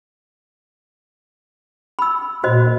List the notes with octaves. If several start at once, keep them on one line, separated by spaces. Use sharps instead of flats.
B5 E6
A#2 F#4 C5 D#5